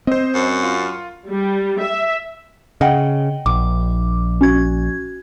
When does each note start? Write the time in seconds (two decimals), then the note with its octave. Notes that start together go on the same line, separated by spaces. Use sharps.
0.07 C4 C5 D#5
0.34 F#2
0.63 F4
1.30 G3
1.80 E5
2.81 C#3 D#5 F#5 G5
3.46 A#1 D6
4.41 C#4 F#4 G#6